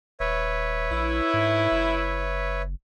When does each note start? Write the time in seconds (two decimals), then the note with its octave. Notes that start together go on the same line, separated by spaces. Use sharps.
0.20 D#1 B4 C#5 E5
0.91 A#1 E4
1.34 G#2
1.72 F#1